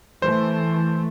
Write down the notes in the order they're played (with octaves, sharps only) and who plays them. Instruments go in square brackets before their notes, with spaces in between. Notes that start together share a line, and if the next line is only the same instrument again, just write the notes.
[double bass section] E3 A3 [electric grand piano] C5